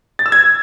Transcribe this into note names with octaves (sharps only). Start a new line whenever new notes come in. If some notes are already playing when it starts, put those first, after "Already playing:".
A6
E6
G#6